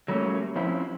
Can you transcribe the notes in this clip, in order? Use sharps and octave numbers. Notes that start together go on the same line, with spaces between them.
F#3 G3 A3 A#3 C#4
F3 C4 C#4 E4